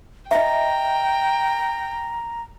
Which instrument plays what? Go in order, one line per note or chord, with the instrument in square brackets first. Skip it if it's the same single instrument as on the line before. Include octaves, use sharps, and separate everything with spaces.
[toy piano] D#5 E5 [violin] G5 [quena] A#5